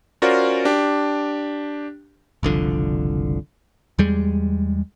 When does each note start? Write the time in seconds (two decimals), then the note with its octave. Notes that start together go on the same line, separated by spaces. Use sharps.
0.22 C#4 F4 F#4 A#4 C5 D5
0.65 D4 G4
2.43 F#1 C2 D3 F3
3.99 E2 G3 G#3